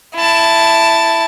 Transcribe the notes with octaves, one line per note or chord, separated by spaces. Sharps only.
E4 A5